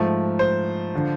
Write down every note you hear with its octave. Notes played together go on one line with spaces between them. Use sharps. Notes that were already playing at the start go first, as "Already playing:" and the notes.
Already playing: G#2 F3 A3
C5
D3 F3